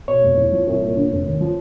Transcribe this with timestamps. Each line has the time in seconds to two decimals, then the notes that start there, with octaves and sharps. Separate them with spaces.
0.08 B2 C#5
0.23 F1
0.37 E2
0.52 F3
0.67 C2
0.82 A#2
0.97 D3
1.11 F1
1.25 D#2
1.41 F3